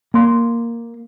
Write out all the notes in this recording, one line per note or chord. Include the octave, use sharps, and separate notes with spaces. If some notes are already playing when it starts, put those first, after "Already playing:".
A#3 C6